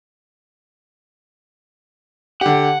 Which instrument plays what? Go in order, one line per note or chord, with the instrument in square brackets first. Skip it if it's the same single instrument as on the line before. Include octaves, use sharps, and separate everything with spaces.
[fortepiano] D3 G4 [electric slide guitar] F#5